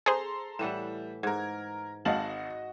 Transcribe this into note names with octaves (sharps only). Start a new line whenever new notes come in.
G#4 A4 C5 A#5 C6
A2 E3 G3 F#5 E7
G#2 A#4 G#6
G#1 F#4 D#5 F5 A5 F#7